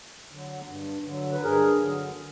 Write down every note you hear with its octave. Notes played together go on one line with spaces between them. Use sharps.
D3 F#3
G2
D3 F#3
B4
G2 G#4 A#4
D3 F#3